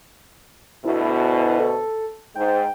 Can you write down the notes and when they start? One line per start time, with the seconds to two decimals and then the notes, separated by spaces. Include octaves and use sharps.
0.85 D2 B2 E4
1.60 A4
2.35 G#2 G5